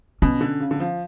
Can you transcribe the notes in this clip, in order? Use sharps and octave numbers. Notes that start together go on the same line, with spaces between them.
B2 C#4
D3
C#3
D3
F3